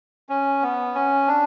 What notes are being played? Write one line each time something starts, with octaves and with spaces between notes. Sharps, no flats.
C#4
B3
C#4
D4